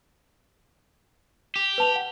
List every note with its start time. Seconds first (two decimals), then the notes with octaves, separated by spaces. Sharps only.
1.56 G4
1.78 B4 A5 F7
1.96 F#5